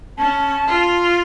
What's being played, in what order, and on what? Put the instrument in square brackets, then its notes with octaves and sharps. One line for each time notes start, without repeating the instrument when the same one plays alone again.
[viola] C#4 [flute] A5
[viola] F4